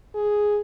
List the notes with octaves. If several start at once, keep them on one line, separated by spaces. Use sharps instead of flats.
G#4